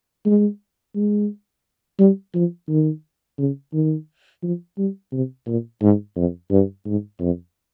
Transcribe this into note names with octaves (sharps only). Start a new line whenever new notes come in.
G#3
G#3
G3
F3
D#3
C#3
D#3
F3
G3
C3
A#2
G#2
F2
G2
G#2
F2